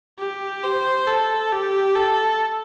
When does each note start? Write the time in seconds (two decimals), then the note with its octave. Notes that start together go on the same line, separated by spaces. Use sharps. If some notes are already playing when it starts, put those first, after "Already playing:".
0.18 G4
0.63 C5
1.07 A4
1.52 G4
1.95 A4